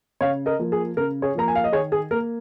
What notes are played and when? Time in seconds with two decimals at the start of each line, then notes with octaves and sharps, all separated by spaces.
0.21 C#3 C#5 F5
0.46 A#4 D#5
0.59 F3 A#3
0.72 G#4
0.97 C#3 A#4
1.22 G#4 C#5
1.35 F3 A#3 A#5
1.48 G#5
1.55 F5
1.64 D#5
1.72 D#3 G#4 C#5
1.92 G#4
2.11 A#3 A#4